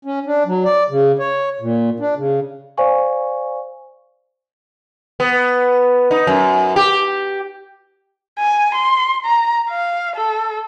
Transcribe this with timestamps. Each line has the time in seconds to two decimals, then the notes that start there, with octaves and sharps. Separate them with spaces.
0.05 C#4
0.26 D4
0.46 F#3
0.65 D5
0.90 C#3
1.19 C#5
1.61 A#2
2.00 D4
2.16 C#3
2.78 C5 D5 F5 G#5 C#6
5.20 B3
6.11 D#4
6.27 F#2
6.76 G4
8.39 G#5
8.74 C6
9.25 A#5
9.69 F5
10.16 A4